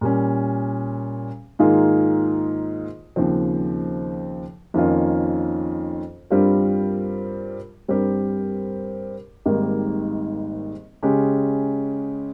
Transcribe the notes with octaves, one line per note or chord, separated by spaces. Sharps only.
A#2 G3 C#4
G#2 D#3 A#3 F4 G#4
D#2 C#3 F3 C4
F2 D#3 A#3 C#4 F4
G2 G3 C4 F4 A#4
G2 G3 C4 G4 A#4
G#1 G#2 D#3 G3 A#3
C#3 G#3 C#4 G4